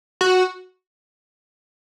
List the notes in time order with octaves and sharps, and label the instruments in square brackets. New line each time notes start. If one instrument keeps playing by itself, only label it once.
[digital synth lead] F#4